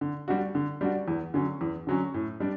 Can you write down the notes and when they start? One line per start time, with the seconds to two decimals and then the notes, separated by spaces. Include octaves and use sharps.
0.01 D3
0.28 G3 D4 F#4
0.55 D3
0.81 G3 D4 F#4
1.08 E2
1.34 D3 F#3 C#4
1.61 E2
1.87 D3 F#3 C#4
2.14 A2
2.40 G3 D4